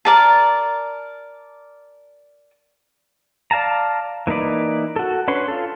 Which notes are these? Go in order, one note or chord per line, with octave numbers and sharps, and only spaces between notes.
A#4 D5 A5
D5 F5 A5 A#5
E3 A#3 D#4 B4 D5
F#4 A4
C#4 D4 B4 C#5 C6
F4 A4